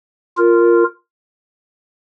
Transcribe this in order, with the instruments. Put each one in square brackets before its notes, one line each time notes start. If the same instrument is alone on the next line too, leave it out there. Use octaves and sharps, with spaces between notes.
[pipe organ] F4 A#4